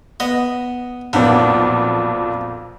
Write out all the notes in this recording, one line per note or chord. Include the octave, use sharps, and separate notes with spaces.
B3 D#5
B1 F2 A#2 B3